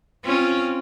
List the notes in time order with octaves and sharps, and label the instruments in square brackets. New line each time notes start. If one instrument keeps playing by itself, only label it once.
[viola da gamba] C4 C#4 F4